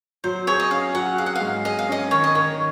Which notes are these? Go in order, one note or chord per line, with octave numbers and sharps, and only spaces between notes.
F#3 C5
G#4 C#5
D#5
C#4 F5
F#3 F#5
G#4 F5
F#5
F5
G#2
G#4 D#5
F5
C#4 D#5
D#3 C#5
D#5
D#3 C#5